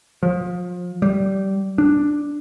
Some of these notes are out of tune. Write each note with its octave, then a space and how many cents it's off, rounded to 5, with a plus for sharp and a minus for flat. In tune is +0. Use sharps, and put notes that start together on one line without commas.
F3 +30
G3 -20
D4 +5